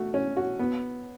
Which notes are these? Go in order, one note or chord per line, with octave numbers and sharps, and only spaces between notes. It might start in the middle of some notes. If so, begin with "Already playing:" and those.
Already playing: A3 F#4
C#4
F#4
B3